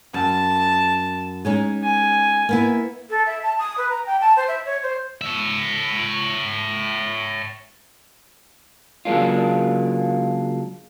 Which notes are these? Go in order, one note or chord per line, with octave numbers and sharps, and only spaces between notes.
F#2 A5
G#3 C#4 D#4
G#5
A#3 B3 E4
A4
E5
A5
D#6
B4
A#5
G5
A5
C5
E5
C#5
C5
C#5 E5
C#3 F#3 G#3 A#3 D4 F4